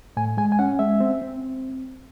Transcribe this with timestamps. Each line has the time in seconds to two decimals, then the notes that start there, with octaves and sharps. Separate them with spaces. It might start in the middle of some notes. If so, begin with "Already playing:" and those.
0.17 A2 G#5
0.37 G#3 G#5
0.52 G#5
0.59 C#4 F#5
0.79 G#3 E5
1.00 C4
1.22 C4